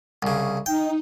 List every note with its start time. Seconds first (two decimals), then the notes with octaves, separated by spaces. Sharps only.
0.23 C2 C#3
0.66 D#4 G5